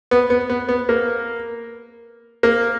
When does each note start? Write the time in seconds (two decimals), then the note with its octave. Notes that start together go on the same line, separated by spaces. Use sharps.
0.11 B3
0.30 B3
0.50 B3
0.69 B3
0.89 A#3
2.43 A#3